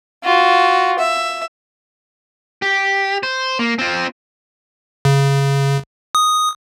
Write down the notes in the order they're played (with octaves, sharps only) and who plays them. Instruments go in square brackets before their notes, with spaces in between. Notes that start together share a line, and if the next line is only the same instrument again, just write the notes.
[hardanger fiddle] F4 F#4
E5
[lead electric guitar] G4
C5
A#3
C4 F4
[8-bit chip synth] C#3
D#6